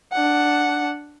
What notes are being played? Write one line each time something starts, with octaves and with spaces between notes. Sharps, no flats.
D4 F#5